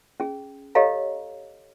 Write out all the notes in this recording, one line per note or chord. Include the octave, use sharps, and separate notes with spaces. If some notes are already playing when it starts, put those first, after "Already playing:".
C#4 G#4
G4 A4 C#5 D#5 F5 A#5